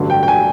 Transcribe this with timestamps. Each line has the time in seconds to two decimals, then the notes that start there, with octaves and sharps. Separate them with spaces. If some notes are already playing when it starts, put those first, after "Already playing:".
Already playing: A1 G2 D3 F#3
0.10 G5
0.23 G5
0.28 G#5